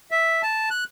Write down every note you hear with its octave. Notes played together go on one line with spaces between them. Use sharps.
E5
A5
F#6